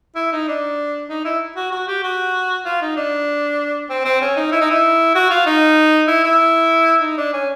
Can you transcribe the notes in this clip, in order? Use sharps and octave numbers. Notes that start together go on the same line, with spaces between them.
E4
D#4
D4
D#4
E4
F#4
F#4
G4
F#4
F4
D#4
D4
C4
C4
C#4
D#4
E4
D#4
E4
F#4
F4
D#4
E4
E4
D#4
D4
C#4